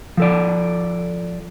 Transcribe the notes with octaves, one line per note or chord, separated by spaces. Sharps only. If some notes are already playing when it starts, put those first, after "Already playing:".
F3 A4 D5